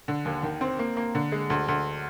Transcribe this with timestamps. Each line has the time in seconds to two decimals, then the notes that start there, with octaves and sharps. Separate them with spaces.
0.08 D3
0.25 D#2
0.43 D#3
0.61 C4
0.79 A#3
0.97 A#3
1.15 D3
1.32 G#3
1.50 D2
1.68 D2